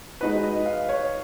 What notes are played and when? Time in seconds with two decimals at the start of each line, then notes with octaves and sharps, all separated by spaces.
0.21 G#3 D#4 F#4 B4
0.43 D#5
0.66 F5
0.89 C#5